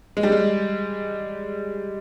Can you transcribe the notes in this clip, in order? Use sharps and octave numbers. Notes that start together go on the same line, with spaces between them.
G#3
G3
G#3